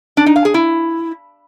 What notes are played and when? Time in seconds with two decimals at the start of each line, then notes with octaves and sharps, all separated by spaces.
0.17 D4
0.26 D#4
0.36 F5
0.45 G#4
0.54 E4